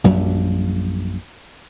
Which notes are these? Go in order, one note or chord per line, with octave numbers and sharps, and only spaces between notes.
A#1 F#2 F#3 G3